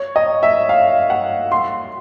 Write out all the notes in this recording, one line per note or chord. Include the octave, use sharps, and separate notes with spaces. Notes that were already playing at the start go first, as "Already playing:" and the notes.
Already playing: C#5
D#5
E5
F5
F#5
C6